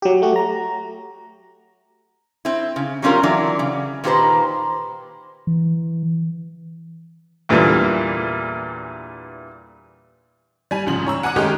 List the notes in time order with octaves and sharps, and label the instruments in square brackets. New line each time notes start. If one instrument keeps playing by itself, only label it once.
[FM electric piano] F#3 G4
A3 F#4 G4
A#5
[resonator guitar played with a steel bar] C4 E4
C#3
F#3 G3 C4 C#4 F4 A#4
E3 F#3 D4 D5
C#3
A#2 D#3 A#3 G4 B4 C5
[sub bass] E3
[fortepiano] E2 A#2 D3 E3 G3
[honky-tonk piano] G3 G#5
C2 G#2 C#3 F3 F#7
C#5 A#5 E6
F#5 G#5 A#5 D6 F#6
D#3 G#3 A3 C#4 D#4 G4